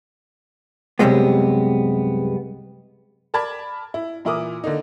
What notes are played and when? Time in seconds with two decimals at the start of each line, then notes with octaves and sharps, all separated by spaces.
0.99 C2 F#2 C3 G3 G#3 B3
3.34 A#4 D5 A5 B5 G#6
3.94 E4
4.25 A#2 E3 E4 A#4 D6 D#6
4.64 D3 A#3 D#4